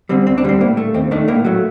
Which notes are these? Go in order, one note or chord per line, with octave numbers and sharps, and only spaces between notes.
D3 G3 C4
D2 C4
D4
D3 G3 C4
A2 A#3
A3
D#2 C4
D#3 A3 D4
A2 A#3
F#3 A3